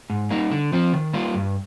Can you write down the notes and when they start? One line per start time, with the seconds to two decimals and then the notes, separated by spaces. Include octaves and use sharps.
0.10 G#2
0.31 G3 A#3 D#4
0.51 D3
0.72 F3 C4 F4
0.93 D#3
1.13 G3 A#3 F4
1.34 G2